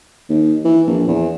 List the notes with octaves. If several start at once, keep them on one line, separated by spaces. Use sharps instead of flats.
D#2
E3
A#1
E2